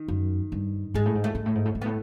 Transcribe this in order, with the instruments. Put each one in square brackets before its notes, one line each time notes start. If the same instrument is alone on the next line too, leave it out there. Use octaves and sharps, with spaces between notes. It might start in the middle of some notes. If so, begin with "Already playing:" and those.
Already playing: [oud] D#3
[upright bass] F#2
G2
[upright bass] G#2 [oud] G#3
[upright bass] A2
G#2
[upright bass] A2 [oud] A3
[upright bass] G#2
A2
G#2
A2
G#2
[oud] B3
[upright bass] A2